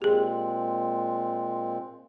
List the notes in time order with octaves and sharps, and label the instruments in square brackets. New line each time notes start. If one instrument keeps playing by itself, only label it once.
[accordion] A#2 G#3 C4 [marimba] G4 G#4